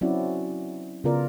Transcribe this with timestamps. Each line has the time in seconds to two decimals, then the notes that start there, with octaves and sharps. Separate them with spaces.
0.01 F#3 C4 C#4 E4 F#4 D5
1.04 C#3 B3 F4 A#4 D5